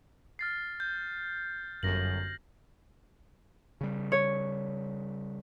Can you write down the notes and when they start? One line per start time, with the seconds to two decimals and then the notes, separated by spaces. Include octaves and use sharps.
0.39 F6 A6 C7
0.80 G6
1.83 G1 F#2 A#6 F#7
3.81 C#3 G3
4.12 C#5